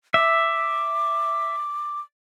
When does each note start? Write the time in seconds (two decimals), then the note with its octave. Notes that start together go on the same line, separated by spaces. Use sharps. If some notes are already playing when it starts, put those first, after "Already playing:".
0.14 E5 D6